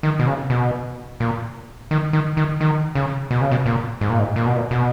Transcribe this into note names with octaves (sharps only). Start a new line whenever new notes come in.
D#3
B2
C#3
B2
A#2
D#3
D#3
D#3
D#3
C#3
B2
C#3
B2
A#2
G#2
A#2
G#2
A#2
B2
A#2
B2